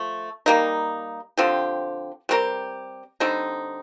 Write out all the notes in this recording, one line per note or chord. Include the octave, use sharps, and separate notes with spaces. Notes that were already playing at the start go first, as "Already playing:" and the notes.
Already playing: F3 A3
G3 A#3 D#4
D3 F3 C4 G4
G3 C4 G4 A#4
D3 G3 C4 D#4